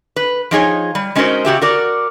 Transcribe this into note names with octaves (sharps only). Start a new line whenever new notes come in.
B4
F3 D#4 G#4 C#5
G3
G#3 C#4 D#4 F#4 A#4 C5
C#3 F#4 G4 E5
F#4 A#4 D5